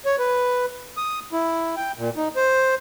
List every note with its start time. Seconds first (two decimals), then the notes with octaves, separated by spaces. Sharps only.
0.05 C#5
0.18 B4
0.97 D#6
1.32 E4
1.76 G5
1.98 A#2
2.17 D#4
2.36 C5